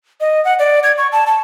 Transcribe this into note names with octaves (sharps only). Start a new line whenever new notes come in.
D#5
F#5
D5
G#6
C#6
A5
A5